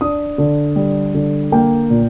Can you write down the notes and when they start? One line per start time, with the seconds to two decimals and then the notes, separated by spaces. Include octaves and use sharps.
0.01 D4 D#6
0.38 D3
0.76 G3
1.15 D3
1.52 A#3 G5
1.90 A#2